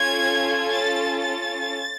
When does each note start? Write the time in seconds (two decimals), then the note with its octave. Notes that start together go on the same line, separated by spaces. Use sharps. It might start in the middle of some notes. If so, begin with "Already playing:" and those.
Already playing: C#4 F4 A4 G#6
0.69 A6
1.21 A6